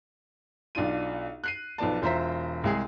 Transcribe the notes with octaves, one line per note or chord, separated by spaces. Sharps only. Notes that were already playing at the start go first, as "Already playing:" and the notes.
B1 D4 F4 D#7
F#6 C7 D#7
B1 F3 B3 D5 A5
E1 F4 C5 E5 A#5 B6
C2 G#3 G#4